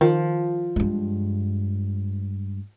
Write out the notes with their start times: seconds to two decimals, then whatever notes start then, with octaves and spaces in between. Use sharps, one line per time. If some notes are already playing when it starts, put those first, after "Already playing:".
0.01 D#3 F3
0.76 G2 G#3